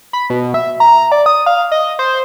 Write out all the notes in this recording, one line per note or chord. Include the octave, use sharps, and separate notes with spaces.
B5
B2
E5
A#5
D5
D#6
F5
D#5
C5